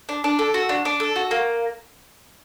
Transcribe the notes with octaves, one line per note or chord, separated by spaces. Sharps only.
D4
D4
A4
F#4
D4
D4
A4
F#4
A#3